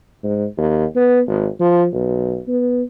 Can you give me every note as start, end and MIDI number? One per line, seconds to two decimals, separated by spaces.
0.23 0.46 44
0.57 0.85 39
0.95 1.21 59
1.27 1.47 32
1.60 1.87 53
1.92 2.39 35
2.48 2.82 59